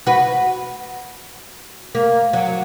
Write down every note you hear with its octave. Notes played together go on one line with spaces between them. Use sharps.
F#4 B4
A#3
F#3